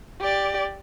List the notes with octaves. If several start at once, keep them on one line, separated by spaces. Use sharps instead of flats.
G4 D5